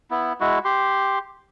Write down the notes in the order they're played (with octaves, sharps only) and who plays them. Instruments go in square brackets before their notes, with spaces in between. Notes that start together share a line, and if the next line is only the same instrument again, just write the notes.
[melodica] B3 E4
G#3 E4 F#4
G4 C6